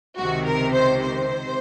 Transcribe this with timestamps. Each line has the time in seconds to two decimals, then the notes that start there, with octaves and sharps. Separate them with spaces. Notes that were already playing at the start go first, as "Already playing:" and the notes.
0.19 C#2 C3 D#3 F#4
0.46 A#4
0.75 C5
1.02 C5